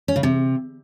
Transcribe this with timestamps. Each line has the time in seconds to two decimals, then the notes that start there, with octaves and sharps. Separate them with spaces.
0.08 C#4
0.16 C#3
0.23 C3